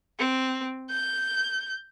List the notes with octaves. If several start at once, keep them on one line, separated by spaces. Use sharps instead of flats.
C4
G6